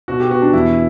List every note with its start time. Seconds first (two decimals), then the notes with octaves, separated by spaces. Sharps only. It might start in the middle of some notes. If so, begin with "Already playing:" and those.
0.08 B2 F#4
0.20 G4
0.30 B3 F#4
0.42 D4
0.53 E2 E4